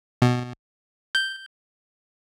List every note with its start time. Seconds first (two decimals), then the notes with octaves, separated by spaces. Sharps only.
0.22 B2
1.15 G6